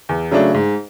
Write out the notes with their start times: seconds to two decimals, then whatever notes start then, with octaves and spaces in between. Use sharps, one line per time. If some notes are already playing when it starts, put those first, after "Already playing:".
0.09 E2
0.31 C#3 F#3 A3 D4
0.54 G#2